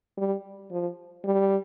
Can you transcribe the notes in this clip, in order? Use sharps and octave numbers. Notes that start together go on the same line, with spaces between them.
G3
F3
G3